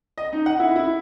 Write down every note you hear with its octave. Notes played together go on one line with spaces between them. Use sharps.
D#5
D#4
F#5
E4
E4